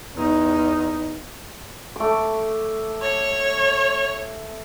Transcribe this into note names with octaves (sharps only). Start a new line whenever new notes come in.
E2 D#4
A3 D6
C#5